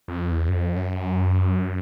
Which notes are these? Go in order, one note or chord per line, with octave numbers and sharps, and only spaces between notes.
F2
E2
F#2
F2
F#2